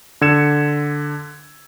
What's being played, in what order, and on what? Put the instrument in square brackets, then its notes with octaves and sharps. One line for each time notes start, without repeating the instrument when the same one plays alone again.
[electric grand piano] D3 E6 G#6 C#7 E7